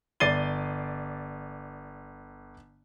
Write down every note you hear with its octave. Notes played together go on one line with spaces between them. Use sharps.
G1 D5 A6 C7 D#7 G7